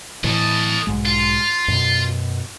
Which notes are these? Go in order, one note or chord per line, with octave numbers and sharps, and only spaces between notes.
A2 E3 A4 D#5
B1 G#2 G#3
F4
F#2 B2